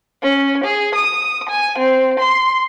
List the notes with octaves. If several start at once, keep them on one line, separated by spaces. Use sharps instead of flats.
C#4
G#4
D#6
G#5
C4
C6